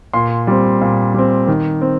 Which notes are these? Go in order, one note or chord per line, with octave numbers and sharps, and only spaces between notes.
A#2 C6
G3 C4
A#2
G3 C4
D#3
C4